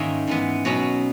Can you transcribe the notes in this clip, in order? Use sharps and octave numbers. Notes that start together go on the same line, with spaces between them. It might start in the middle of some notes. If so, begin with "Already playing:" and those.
Already playing: G#2 D#3 A#3 C#4 E5
G#2 E3 B3
B2 F#3 C#4